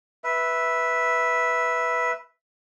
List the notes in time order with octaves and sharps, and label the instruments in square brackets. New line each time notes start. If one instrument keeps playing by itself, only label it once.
[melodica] B4 E5